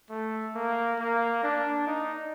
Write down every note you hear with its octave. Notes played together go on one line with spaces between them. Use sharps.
A3
A#3
A#3
D4
D#4